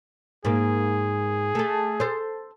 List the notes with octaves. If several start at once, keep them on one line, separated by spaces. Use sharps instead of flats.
G#2 A#3 G#4
A3 A4
A4 C5